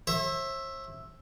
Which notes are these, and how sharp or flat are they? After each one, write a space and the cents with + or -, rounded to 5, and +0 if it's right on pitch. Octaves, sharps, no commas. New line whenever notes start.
C5 +45 E5 +0